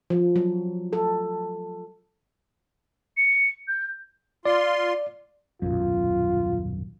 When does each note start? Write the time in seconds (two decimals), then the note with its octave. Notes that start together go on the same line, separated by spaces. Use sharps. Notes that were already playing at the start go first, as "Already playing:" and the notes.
0.10 F3
0.36 F#3
0.93 A4
3.17 C#7
3.68 G6
4.45 F4 D5 C6
5.62 D#1 B1 F#2 F4